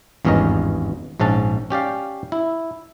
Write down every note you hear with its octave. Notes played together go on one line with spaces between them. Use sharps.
G#1 E2 G2 C#4 A#4 D#5
A#1 G#2 C#4 A5
C#4 G4 D5 F5
E4